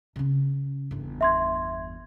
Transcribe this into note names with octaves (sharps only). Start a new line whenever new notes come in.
C#3 C#4
G1 E2
E5 C6 G#6